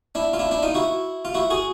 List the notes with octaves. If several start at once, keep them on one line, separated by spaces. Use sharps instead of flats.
D4 E4
F4
D4 E4
D4 E4
D#4 F4
E4 F#4
F4
E4 F#4
F#4 G#4